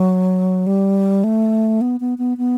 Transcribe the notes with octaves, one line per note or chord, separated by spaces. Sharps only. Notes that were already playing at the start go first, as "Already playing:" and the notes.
Already playing: F#3
G3
A3
B3
B3
B3
B3